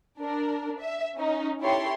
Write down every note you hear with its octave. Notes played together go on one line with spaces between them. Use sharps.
D4 A#4
E5
C#4 D#4
E4 G4 A4 C#5 G5 C6